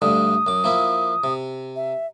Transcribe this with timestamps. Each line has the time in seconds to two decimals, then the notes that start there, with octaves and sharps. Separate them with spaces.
0.02 D2 G2 D3 D#6
0.47 F#2 D6
0.64 F3 A#3 E4
1.24 C3
1.76 E5